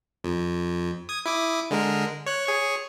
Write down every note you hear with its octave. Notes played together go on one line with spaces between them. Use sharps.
F2
D#6 G#6
E4 D6 D#6
D3 G#3 A#4
C#5 F#6
G#4 C#5 C#6